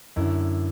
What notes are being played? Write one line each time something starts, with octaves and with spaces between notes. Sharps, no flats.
F#2 D3 E4